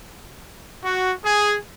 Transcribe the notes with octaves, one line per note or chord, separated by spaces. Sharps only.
F#4
G#4